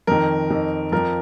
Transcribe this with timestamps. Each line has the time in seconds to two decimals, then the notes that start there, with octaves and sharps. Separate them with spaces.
0.07 F2 D#3 A#4
0.50 F2 D#3
0.92 F2 F3 A#4